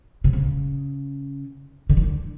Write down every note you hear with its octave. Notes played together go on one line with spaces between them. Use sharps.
C3
C#3
D3
D#3
D3